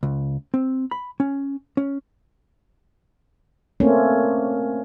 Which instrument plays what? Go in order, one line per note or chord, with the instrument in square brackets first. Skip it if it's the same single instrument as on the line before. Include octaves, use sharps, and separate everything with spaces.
[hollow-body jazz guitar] C#2
C4
B5
C#4
C#4
[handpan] A3 A#3 C4 C#4